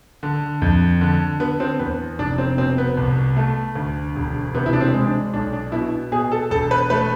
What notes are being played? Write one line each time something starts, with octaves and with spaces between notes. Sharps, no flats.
D3
F2
D3
D3 B3
C4
E2 B3
F1 D4
C4
B2 C4
B3
C2
A3
D2
E1
C3 B3
E4
D4
C4
G#3
D4
B1 D4
D4
B2 E4
B2 G#4
A4
E1 A4
B4
A3 B4